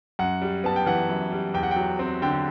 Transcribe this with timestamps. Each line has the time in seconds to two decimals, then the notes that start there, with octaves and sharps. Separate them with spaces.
0.19 F#2 F#5
0.42 G3
0.64 B3 A5
0.76 G5
0.86 E3 F#5
1.09 F#2
1.32 G3
1.54 E2 G5
1.63 F#5
1.71 G5
1.76 F#3
1.99 C4
2.22 D3 G5